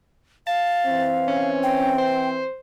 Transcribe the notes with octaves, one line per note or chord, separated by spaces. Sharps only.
F5 A5
E3 C4
C#4
G5
C5